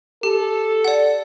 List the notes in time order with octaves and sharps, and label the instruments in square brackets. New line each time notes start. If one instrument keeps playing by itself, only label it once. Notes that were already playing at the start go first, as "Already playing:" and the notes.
[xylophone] G4 [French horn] A4
[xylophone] D5 F#5